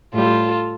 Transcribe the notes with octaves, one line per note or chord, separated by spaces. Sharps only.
A2 G3 F4 A4